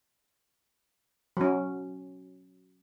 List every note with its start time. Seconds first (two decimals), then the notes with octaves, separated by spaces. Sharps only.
1.37 F#3 C#4